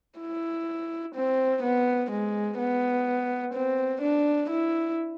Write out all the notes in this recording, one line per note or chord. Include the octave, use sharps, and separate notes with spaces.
E4
C4
B3
G#3
B3
C4
D4
E4